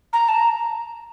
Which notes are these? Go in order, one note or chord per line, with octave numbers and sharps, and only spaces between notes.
A#5
A5
A#5